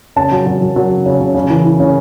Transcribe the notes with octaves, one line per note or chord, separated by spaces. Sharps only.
C#3 A5
F#3
F#3
F#3
F#3
C#3
C#3
C#3
C#3
E3
E3
C#3